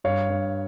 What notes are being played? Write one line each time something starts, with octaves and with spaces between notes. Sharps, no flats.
G2 C#5 F5
G2